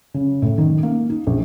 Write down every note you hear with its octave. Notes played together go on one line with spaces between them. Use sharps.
C#3
A2
D#3
A#3
D#4
A#1